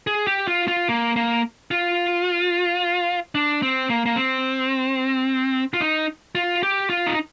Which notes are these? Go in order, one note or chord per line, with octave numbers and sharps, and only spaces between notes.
G#4
G4
F4
F4
A#3
A#3
F4
D4
C4
A#3
A#3
C4
F4
D#4
F4
G4
F4
D#4